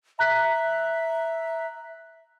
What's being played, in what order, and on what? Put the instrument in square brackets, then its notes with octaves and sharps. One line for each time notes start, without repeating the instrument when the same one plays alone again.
[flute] E5 [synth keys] A#5 F#6 B6